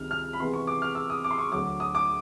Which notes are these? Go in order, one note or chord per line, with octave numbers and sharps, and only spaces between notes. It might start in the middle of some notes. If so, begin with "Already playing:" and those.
Already playing: C#2 C3 D#3 G3 F6
F6
B5
C3 E3 G#3 B3 C6
C#6
D6
F6
E6
D#6
D6
C6
C#6
D2 D3 F#3 D6
D#6
D6